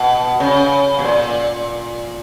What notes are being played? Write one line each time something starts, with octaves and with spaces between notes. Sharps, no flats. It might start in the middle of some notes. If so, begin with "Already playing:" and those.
Already playing: B2
C#3
B2
A#2